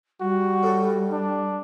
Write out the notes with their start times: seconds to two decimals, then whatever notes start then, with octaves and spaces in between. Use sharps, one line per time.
0.21 G3 F#4
0.63 A2 A3
1.12 D4